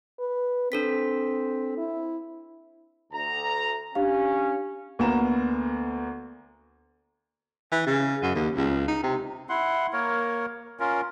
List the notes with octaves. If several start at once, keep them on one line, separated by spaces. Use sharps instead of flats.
B4
C4 D4 A4 B6
E4
D2 A#5
C#4 D4 G4 F5
D2 A#3 B3 A#5 E7
E3
C#3
F#2
D#2
C#2
D#4
C3
E4 F#5 C6
A#3 A#4 C#5
C#4 F4 A#4